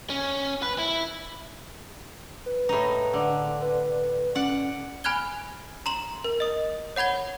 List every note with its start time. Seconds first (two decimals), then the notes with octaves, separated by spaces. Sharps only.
0.10 C#4
0.62 B4
0.78 E4
2.46 B4
2.69 A2 D#4
3.13 D3
3.61 B4
4.35 C#4 D5 F#5
5.04 G#5 B5 F6 F#6 G#6 G7
5.86 A#5 C6 E7 F#7
6.24 A#4
6.40 D#5 D#6
6.96 C#5 F#5 B5 G#6 G7